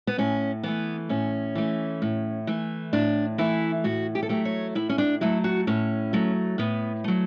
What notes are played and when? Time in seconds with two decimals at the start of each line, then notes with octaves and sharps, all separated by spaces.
0.07 B3
0.18 A2 C#4
0.63 E3 A3 B3
1.09 A2 C#4
1.55 E3 A3
2.02 A2
2.47 E3 A3
2.93 A2 D4
3.38 E3 A3 E4
3.84 A2 F#4
4.15 G4
4.23 A4
4.29 F#3 A3 G4
4.45 C#5
4.75 A2 E4
4.89 C#4
4.98 D4
5.21 F#3 A3 E4
5.44 F#4
5.67 A2 C#4
6.13 F#3 A3
6.58 A2 B3
7.04 F#3 A3